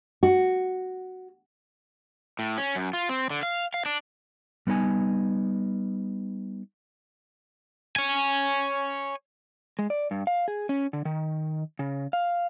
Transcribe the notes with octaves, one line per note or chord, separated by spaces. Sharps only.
F#4
A2
C#4
F#2
F4
C4
D3
F5
F5
D4
G3 B3 D#4 A#4 G#5
C#5 G#5
G#3
D5
G2
F5
G#4
C#4
D3
D#3
C#3
F5